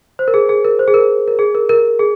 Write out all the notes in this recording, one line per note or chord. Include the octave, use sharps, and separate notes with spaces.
C5
A#4
G#4
G#4
A#4
C5
G#4
A#4
A#4
G#4
A#4
A#4
G#4